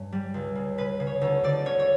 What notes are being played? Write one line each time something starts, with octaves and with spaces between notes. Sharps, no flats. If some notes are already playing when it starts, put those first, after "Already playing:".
Already playing: G2 C#4
G3
C#2
C#3
C#3 B4
C#3
C#5
D2 C#5
D2 D5
C#4 C#5
C#5